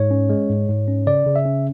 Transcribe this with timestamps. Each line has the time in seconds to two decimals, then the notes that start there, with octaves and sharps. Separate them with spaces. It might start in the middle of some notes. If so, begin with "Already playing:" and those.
Already playing: G#2 C#5
0.11 C#4
0.30 G#3
0.49 G#2
0.68 G#2
0.88 C#4
1.06 C#3 D5
1.26 C#3
1.36 E5
1.45 C#4